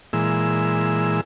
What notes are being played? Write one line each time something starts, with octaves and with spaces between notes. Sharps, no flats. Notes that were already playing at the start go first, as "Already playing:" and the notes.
A#2 E3 G#3 E6